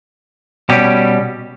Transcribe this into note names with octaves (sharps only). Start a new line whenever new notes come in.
B2 G3 C#4 G4